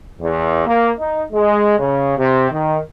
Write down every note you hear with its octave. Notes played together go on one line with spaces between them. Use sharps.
E2
A#3
D#4
G#3
C#3
C3
D#3